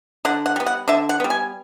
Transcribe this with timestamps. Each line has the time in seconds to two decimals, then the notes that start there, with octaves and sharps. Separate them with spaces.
0.25 D3 F#5
0.46 F#5
0.56 G3 B3
0.66 F#5
0.88 D3 E5
1.09 F#5
1.20 G3 B3
1.30 G#5